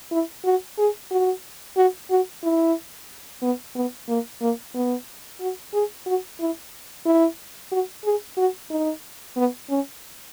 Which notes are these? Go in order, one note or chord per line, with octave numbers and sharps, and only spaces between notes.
E4
F#4
G#4
F#4
F#4
F#4
E4
B3
B3
A#3
A#3
B3
F#4
G#4
F#4
E4
E4
F#4
G#4
F#4
D#4
B3
C#4